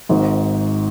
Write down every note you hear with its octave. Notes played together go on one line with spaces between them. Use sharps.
G#1 G#2